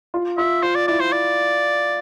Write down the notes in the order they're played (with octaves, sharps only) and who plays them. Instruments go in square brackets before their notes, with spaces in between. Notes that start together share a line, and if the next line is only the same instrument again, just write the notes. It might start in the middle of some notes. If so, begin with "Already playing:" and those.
[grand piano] F4
[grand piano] F4 [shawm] E5
[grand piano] F4 [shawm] C5
[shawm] D5
[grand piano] E4 [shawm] D5
[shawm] C5
D5